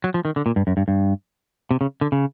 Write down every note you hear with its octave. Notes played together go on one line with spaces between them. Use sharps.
F#3
F3
D#3
D3
A#2
G2
F#2
G2
G2
C3
C#3
D3
C#3